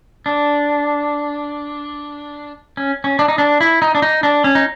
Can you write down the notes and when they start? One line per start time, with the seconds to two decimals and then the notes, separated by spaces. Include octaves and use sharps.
0.26 D4
2.77 C#4
3.04 C#4
3.19 D4
3.28 D#4
3.38 D4
3.61 E4
3.82 D#4
3.95 D4
4.02 D#4
4.23 D4
4.44 C#4
4.55 D#4